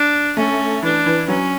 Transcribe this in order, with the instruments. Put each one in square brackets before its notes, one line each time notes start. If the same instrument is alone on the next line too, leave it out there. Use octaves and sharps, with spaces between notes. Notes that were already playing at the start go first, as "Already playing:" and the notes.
Already playing: [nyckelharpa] D4
[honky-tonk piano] A3 [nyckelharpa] C#4
[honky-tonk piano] E3 [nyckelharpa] D4
[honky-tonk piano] E3
[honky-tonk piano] F#3 [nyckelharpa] C#4